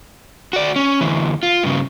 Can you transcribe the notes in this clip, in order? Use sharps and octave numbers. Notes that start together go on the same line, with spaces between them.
F#4 D5
C#4
D2 E3
F4
G2 C#3